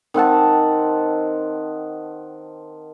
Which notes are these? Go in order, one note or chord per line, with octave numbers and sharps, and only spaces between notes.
D#3 C4 F#5 A5